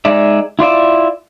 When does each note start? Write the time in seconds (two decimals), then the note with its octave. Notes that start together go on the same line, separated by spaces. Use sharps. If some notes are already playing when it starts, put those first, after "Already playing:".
0.05 G#3 D#4 D5 E5
0.59 E4 F4 D5 E5